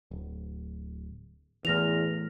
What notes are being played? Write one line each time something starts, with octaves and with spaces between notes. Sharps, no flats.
D1
E2 A2 E3 F6 A#6 F7